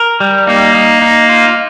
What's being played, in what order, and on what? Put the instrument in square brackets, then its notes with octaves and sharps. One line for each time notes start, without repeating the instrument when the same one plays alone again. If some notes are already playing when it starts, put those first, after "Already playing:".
Already playing: [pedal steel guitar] A#4
G3
[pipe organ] A#3 [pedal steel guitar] D#4
[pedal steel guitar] D#4
D#4
F4